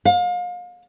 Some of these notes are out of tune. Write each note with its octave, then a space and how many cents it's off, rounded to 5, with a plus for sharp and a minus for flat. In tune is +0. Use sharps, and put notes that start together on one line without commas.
F5 +35